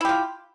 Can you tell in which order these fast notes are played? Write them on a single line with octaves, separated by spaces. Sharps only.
E4 G4 F4